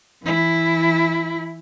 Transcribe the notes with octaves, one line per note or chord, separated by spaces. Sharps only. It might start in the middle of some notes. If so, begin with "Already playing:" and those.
E3 E4